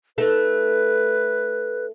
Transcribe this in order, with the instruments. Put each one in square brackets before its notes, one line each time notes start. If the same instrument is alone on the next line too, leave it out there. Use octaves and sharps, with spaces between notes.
[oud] A3 D#4 A4 [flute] B4